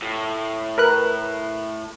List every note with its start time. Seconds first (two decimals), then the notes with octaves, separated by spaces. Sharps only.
0.02 A2
0.78 A#4 B4 F#6